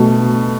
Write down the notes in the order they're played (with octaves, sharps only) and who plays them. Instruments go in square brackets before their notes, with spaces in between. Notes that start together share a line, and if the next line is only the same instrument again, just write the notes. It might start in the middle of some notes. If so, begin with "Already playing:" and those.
Already playing: [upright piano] B2 A3